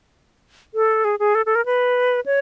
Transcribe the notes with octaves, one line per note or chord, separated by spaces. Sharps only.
A4
G#4
G#4
A4
A4
A#4
B4
C#5